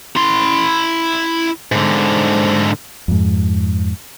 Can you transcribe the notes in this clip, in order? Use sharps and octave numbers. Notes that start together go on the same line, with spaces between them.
E4 C6
G#2 D3
F2 G#2